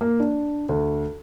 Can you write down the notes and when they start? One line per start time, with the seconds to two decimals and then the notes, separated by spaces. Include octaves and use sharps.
0.01 A#3
0.20 D4
0.69 D2